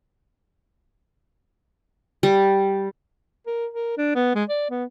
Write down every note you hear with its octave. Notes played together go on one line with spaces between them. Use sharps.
G3
A#4
A#4
D4
B3
G#3
D5
B3